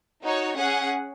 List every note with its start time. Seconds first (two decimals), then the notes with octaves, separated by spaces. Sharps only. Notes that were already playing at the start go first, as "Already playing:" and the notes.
0.24 D#4 F#4 C#5
0.58 C#4 G#4 F#5